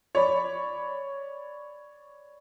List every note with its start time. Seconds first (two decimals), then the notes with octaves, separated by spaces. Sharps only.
0.15 C#5 D5 B5